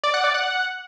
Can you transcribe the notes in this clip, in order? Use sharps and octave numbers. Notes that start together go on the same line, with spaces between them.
D5
F#5
D5
F#5